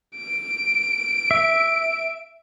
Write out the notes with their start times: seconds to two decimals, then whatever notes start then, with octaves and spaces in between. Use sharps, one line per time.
0.16 D7
1.31 E5